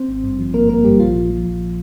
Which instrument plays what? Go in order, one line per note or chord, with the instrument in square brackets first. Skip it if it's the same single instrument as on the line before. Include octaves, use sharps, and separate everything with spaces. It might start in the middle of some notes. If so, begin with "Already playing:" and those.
Already playing: [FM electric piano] C4 C5
G#1
G2
F3
G#1 A#3 A#4
G#1 A#3 A#4
G2 G3 G4
A#1 F3 F4
A#2
F3
A#1